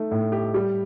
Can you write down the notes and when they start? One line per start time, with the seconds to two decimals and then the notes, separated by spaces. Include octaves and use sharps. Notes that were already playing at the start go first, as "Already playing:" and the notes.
Already playing: A3 D#4
0.11 A2
0.32 G4
0.54 G3